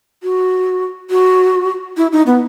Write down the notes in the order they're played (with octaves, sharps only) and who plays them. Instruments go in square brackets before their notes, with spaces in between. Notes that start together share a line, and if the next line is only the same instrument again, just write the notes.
[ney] F#4
F#4
E4
D#4
B3